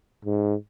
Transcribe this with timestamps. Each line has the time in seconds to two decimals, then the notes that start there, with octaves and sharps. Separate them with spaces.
0.25 G#2